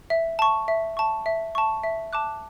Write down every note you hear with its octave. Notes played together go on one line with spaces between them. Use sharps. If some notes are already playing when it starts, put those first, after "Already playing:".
E5
A5 C#6
E5
A5 C#6
E5
A5 C#6
E5
A5 D6 F#6